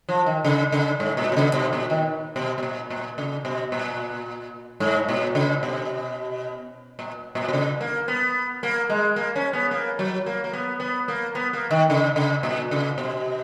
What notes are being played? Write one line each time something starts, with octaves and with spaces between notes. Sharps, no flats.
F3
D#3
C#3
C#3
G#2
A#2
B2
C#3
B2
A#2
D#3
B2
B2
A#2
A#2
C#3
B2
A#2
G#2
A#2
C#3
B2
A#2
A#2
B2
C#3
A#3
B3
A#3
G#3
A#3
C#4
B3
A#3
F#3
A#3
A#3
B3
B3
A#3
B3
A#3
D#3
C#3
C#3
A#2
C#3
B2